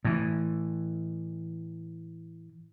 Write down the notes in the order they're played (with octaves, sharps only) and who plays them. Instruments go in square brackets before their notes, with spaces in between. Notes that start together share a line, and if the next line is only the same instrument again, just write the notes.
[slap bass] A2 E3